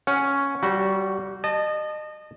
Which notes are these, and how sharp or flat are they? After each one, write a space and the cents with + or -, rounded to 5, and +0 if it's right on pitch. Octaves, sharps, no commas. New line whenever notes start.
C#4 +0 F#5 +0
G3 -25 F#4 +0
D#5 -30 A5 -5